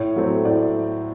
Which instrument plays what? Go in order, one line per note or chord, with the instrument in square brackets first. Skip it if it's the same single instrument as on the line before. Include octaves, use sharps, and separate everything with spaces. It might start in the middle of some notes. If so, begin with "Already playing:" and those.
Already playing: [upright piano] A2 [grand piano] C#5
[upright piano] F#3 A3 C4
[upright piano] A2 [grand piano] D5